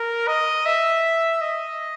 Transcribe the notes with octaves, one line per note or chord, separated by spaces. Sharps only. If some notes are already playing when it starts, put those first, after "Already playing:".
Already playing: A#4
D#5
E5
D#5